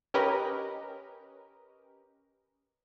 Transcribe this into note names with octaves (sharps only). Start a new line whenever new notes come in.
C#4 G4 A#4 B4 D#5